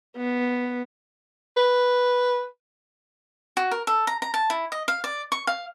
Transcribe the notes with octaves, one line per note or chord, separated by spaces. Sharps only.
B3
B4
F#4
A#4
A4
A#5
A#5
A5
E4
D#5
F5
D5
C#6
F5